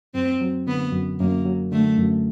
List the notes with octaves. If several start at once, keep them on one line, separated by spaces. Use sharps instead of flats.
F#2 C4
F#3
D3 B3
F#2
F#2 A#3
F#3
D3 A3
F#2